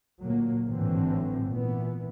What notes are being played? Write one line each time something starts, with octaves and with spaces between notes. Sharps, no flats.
D2 A#2 F#3 A#3
G#1 A2 D3 E3 F#3 C4
A#2 E3 B3